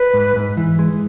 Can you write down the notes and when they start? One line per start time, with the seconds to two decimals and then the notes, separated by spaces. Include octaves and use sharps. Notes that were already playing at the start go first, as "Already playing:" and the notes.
Already playing: B4
0.14 G#2
0.36 G#2
0.57 E3
0.79 G#3